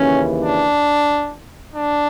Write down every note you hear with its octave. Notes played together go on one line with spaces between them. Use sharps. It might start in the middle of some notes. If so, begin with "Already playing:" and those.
Already playing: D#2 C#3 E3 C#4
D4
D4